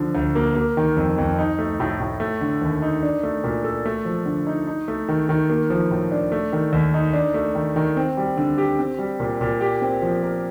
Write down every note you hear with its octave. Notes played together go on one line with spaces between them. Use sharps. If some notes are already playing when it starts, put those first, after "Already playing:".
Already playing: D3 F3
D2
A#3
A#3
D#3
F2
F2
D#4
A3
A2
A2
A3
D3
D#2
D#4
D4
A3
A#2
A4
A3
F3
D3
D#4
D#4
A3
D#3
D#3
A#3
F3
A2
D4
A3
D#3
D#2
D#4
D4
A3
D#3
D#3
C4
G3
D3
G4
C4
G3
A#2
A#2
G4
C4
F3
A#4